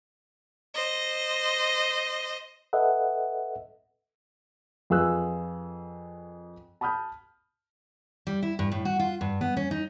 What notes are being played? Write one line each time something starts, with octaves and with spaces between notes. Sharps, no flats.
C5 D#5
A4 B4 D#5 E5 F#5
F2 F4 G#4 B4 E6 F#6
A5 B5 D#6 F6 G6
G3
E4
G2
A2
F#4
F4
G2
B3
C#4
D#4